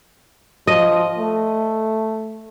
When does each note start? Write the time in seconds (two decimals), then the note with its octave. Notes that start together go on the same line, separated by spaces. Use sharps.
0.67 F3 D#5
1.18 A3